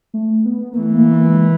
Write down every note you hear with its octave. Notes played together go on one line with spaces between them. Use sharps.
A3
B3
A#3
E3 A3
A#3
A#3
G#3